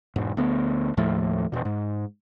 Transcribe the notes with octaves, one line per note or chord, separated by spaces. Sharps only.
E1 G#2
D2 B3
D#2 A2 F3 A3
E1 B2
G#2